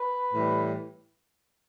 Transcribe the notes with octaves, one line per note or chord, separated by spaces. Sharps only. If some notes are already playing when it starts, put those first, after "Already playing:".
Already playing: B4
A2 E3 G3